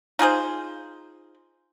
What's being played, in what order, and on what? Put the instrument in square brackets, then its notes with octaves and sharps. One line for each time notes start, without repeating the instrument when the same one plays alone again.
[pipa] D#4 F4 G#4 C5